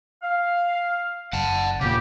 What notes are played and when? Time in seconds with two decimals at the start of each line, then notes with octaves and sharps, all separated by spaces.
0.23 F5
1.33 F#1 F#5 A5
1.81 E1 A#2 C#3 G4